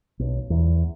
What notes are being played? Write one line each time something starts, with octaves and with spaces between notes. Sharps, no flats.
B1
E2